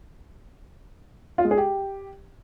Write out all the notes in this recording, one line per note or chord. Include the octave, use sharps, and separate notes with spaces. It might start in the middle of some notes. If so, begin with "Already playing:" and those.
F4
G#3
G#4
G4